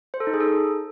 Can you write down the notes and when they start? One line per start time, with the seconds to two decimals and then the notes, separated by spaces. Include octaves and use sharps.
0.14 C5
0.20 A4
0.27 D#4
0.34 G#4
0.40 A4